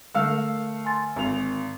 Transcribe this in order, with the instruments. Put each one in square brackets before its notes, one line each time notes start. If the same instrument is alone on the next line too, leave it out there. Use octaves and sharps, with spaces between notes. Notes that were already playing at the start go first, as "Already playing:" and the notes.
[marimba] D3 A#4 [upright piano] A3 F5 E6
[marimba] G#5 C6 A6
[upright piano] G#1 F7